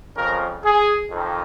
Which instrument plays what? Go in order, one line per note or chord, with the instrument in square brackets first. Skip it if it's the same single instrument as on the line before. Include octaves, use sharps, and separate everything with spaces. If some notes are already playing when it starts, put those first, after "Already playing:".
[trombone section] F2 C#3 F3 A#4
G#4
F2 D#3